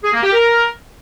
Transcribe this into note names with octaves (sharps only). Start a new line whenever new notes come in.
G#4
A#3
G4
A#4